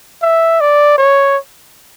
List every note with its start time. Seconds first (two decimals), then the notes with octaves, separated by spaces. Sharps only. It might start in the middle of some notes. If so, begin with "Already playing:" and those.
0.22 E5
0.61 D5
0.98 C#5